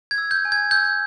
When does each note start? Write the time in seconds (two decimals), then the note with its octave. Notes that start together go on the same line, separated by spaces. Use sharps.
0.11 G#6
0.18 E6
0.31 G6
0.45 G#5
0.52 G#6
0.71 E6 G6